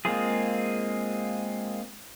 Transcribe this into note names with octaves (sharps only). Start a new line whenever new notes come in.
G#3 A#3 C4 F4 G#4